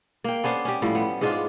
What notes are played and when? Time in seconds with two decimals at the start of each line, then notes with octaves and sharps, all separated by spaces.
0.24 A#3 G5
0.44 B3 C#4 D4 C5
0.65 C#4 G4
0.82 A2 F3 G3
0.95 B3
1.21 G#2 G#3 D4 F4